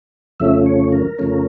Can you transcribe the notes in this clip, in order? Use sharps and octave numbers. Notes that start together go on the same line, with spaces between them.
F2 C#3 F3 A3 C#4 E5
C#5
A#4
F2 C#3 F3 A3 C#4